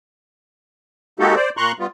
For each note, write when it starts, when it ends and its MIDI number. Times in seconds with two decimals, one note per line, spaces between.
1.20 1.35 56
1.20 1.35 58
1.20 1.35 63
1.20 1.35 66
1.20 1.35 67
1.20 1.35 69
1.35 1.50 72
1.35 1.50 74
1.57 1.72 46
1.57 1.72 82
1.57 1.72 84
1.57 1.72 85
1.57 1.72 90
1.79 1.87 55
1.79 1.87 59
1.79 1.87 65